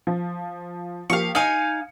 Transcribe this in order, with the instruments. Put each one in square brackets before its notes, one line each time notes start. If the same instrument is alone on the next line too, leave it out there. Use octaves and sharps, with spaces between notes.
[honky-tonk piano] F3
[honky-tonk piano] F3 A#3 G4 [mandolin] F5 C#6
[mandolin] D#4 F5 G#5 [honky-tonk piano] C#7